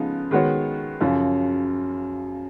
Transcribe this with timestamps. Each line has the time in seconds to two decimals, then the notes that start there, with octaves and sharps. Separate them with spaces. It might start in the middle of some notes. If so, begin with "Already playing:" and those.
Already playing: C#3 F3 G#3 B3 D#4
0.31 D#3 G#3 B3 F#4 C#5
1.01 F#2 C#3 F3